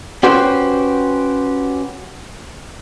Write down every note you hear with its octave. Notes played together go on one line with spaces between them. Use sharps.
C#4 F#4 G4 B4 C5